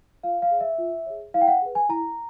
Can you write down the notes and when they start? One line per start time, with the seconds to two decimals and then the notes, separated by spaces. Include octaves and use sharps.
0.23 F4 F5
0.42 F5
0.51 G#4 C#5
0.61 E5
0.78 F4
1.06 G#4 C#5
1.34 E4 F5
1.41 G5
1.47 F#5
1.62 G#4 B4
1.75 G#5
1.89 E4 A#5